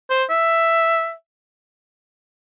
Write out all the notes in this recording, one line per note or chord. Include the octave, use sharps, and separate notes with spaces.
C5
E5